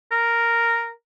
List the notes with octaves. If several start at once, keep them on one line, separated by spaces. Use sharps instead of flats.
A#4